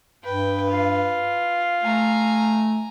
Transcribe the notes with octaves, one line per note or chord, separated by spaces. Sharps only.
G2 B4 G5
F4
A3 G#5 A#5